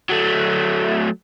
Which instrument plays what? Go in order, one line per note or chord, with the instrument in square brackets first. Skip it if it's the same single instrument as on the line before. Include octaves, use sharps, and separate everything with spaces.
[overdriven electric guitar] F#3 A3